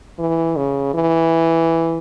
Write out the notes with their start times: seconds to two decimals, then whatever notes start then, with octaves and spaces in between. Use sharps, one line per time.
0.19 E3
0.56 C#3
0.94 E3